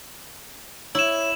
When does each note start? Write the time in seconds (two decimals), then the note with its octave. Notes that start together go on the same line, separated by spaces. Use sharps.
0.95 E4 C#5 E5 E7 F#7